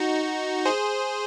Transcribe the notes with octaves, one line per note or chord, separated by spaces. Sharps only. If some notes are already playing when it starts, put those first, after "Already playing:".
Already playing: D#4 F#4
G#4 C5